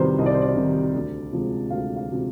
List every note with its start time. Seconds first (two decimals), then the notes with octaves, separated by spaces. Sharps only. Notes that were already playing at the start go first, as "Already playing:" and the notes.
Already playing: C2 C3 D#3 G3 B4 C5
0.18 C2 D#5
0.26 D5
0.34 C5
0.42 D5
0.56 C3 D#3 G3
0.95 D2
1.32 C3 F3 G#3
1.70 D2 F5
1.96 F5
2.10 C3 F3 G#3